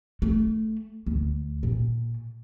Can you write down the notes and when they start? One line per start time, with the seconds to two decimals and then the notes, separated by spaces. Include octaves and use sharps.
0.22 A3
1.06 D2
1.63 A#2